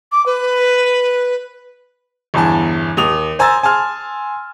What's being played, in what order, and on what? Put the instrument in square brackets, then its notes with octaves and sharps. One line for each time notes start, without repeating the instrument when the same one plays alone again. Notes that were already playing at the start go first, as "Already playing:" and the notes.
[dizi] D6
B4
[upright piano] G1 E2 E3 G#5 A5
D#2 D#6 F7
C5 G#5 A#5 E6 A6
G#5 A5 C6 F6